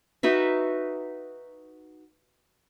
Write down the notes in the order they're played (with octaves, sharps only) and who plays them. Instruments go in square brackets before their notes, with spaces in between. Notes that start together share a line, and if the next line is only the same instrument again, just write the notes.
[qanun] D#4 F#4 B4 E5